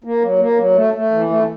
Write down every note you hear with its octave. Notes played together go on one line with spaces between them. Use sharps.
A#3
F#3
A#3
F#3
A3
A3
E3
A3